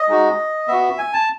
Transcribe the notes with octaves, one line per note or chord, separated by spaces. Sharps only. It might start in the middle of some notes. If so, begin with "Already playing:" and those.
Already playing: D#5
G#3 D#4 F#4
B3 F#4 E5
G#5
A5